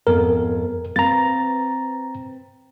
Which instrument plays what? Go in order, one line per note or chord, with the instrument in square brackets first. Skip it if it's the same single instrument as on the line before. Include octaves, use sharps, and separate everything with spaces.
[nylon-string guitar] F2 G#2 B3 [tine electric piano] A#4
[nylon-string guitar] C4 B4 F5 [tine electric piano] A#5 A6